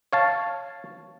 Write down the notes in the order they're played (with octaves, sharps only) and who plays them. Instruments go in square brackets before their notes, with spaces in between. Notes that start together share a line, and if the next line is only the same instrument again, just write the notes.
[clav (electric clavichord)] C#5 F5 A5